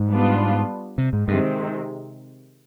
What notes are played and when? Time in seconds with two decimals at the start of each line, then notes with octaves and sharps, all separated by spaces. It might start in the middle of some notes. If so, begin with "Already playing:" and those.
Already playing: G#2
0.09 G3 B3 D4 F4
0.98 C3
1.13 G#2
1.28 G2 C3 D#3 G#3 C4